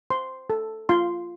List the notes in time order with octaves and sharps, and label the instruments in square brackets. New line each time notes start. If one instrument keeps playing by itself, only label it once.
[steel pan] C5 C6
A4
F4 C6